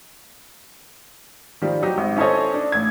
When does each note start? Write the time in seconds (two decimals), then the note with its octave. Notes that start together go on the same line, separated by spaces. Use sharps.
1.62 D#3 F3 G3
1.82 F#3 D#4 G4
1.98 G#1
2.17 C#4 E4 A4 C5 C#5 D#5
2.54 D4
2.72 A1 G#6